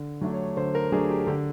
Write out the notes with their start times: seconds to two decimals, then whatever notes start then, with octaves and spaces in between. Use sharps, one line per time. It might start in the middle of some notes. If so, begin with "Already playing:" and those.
Already playing: D3
0.21 F#3 A3 D4
0.34 C#5
0.57 D3 C5
0.75 A#4
0.92 F#3 A3 D4 G#4
1.10 G4
1.27 D3 G4